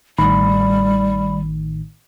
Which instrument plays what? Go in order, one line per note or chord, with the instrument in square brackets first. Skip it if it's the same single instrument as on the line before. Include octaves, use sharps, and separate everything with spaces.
[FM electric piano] A1 A2 D#3 [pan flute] G3 [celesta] B5